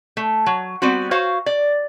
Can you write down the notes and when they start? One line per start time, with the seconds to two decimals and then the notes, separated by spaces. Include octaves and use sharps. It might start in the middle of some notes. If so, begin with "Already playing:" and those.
0.17 A3
0.46 F#3
0.82 G3 B3 C4 F#4
1.11 F#4 C5 C#5 F5
1.46 D5